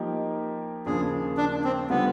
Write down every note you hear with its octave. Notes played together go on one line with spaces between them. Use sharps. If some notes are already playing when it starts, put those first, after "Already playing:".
Already playing: F3 A#3 D#4 G4 A#4
D#2 C#3 F3 A#3 D4 G#4
D4
C4
D3 G3 B3 C4 F4